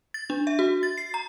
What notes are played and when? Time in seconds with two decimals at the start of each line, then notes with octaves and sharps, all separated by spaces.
0.14 A6
0.30 D4
0.47 E5
0.59 F#4
0.83 A6
0.98 C7
1.14 A#5